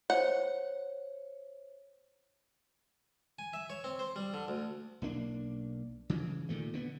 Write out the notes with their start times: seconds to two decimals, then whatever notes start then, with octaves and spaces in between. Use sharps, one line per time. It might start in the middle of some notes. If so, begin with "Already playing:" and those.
0.10 C5 C#5 F#5
3.39 G#5
3.53 E5
3.70 C#5
3.84 C4
3.99 C5
4.16 G3
4.34 D3
4.48 D2
5.02 B1 A#3 D4
6.10 C#3 E3
6.49 A#2 D#3 A3
6.74 D3 B3